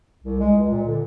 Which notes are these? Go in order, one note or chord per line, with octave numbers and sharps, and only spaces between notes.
C2
G#3
C#2
A#2
D3